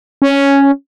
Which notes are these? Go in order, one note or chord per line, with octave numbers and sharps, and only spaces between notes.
C#4